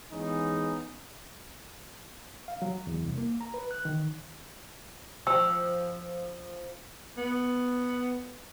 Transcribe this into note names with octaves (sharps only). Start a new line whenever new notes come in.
E3 G#3 B3 C#4 D#4
F5
F#3
E2
C2
A#3
A#5
B4
F#6
D#3
F3 G5 C#6 E6
B3